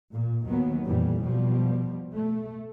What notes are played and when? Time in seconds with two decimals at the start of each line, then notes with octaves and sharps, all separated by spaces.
0.11 A#2
0.44 D#2 D#3 F#3 B3
0.85 F2 A#2 E3 G3
1.22 B2 F3 G3
2.13 A3